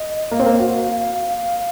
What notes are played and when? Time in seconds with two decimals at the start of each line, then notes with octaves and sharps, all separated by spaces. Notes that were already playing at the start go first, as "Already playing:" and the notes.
Already playing: D#5
0.31 A#3 F5
0.39 C4
0.46 A#3
0.59 F#4